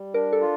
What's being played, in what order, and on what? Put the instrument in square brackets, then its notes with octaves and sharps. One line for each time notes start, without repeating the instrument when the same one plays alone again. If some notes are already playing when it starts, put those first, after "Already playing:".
Already playing: [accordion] G3
[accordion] D4 [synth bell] A#4
[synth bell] A4
[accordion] F4